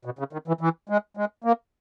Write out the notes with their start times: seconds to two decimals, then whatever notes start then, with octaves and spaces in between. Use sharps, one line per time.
0.05 B2
0.19 C#3
0.33 D#3
0.48 E3
0.61 E3
0.89 G#3
1.17 G#3
1.44 A#3